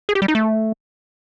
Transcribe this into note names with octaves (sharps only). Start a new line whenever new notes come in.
G#4
G4
G3
D#4
A3